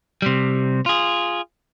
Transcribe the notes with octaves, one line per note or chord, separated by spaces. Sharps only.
C3 G3
F4 G#4